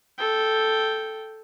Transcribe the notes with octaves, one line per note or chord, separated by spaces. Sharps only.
A4 G5